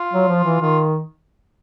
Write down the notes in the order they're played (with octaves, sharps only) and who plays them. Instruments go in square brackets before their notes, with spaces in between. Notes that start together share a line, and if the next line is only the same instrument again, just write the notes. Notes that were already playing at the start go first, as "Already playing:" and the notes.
Already playing: [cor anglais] F4
[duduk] F#3
F3
E3
[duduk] D#3 [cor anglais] F4